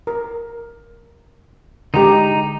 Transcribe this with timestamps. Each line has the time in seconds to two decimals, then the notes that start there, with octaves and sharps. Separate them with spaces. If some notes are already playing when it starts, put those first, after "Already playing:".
0.07 A#4
1.94 D3 G#3 D#4 G4 A#5